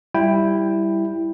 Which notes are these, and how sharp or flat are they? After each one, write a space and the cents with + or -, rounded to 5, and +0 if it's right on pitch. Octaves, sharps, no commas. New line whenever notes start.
G3 +0 E4 +0 G5 +10